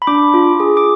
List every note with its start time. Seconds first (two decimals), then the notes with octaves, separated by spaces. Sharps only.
0.02 B5
0.07 D4 D6
0.34 F4
0.60 G#4
0.77 D6